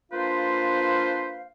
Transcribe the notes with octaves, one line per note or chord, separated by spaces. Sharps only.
A#3 D4 F4 B4 C5 F5